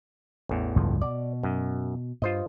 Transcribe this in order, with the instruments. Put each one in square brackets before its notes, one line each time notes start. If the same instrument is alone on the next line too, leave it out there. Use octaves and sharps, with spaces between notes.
[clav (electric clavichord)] A1 E2
[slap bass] C#2 G2 F3
[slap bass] B2 [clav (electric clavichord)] D5
[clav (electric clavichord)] F#2
[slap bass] G2 [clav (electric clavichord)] F4 C5 D#5